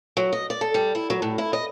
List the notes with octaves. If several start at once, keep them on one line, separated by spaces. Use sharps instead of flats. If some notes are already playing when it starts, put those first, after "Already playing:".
F#3
D#5
D5
A4
G3
E4
F#3
A2
E4
D#5